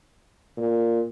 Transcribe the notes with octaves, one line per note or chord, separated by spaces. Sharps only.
A#2